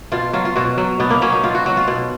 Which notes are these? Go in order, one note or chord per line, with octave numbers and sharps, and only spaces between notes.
B2 F4
F#3 F4
F4
B2 F#4
F#3
B2 B3
A#3
F#3 C#4
D#4
B2 F4
F#4
F#3 F#4
F4
B2